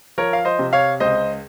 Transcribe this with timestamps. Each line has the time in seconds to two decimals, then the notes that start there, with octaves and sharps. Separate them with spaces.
0.18 F3 A#4 C#5
0.33 F5
0.45 C5 D#5
0.59 C3
0.73 C#5 F5
1.00 C#2 C5 D#5